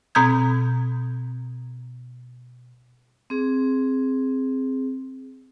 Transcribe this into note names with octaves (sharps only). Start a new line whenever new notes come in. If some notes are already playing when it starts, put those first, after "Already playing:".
B2 C4 A#5 D#6 G6 G#6
C4 G#4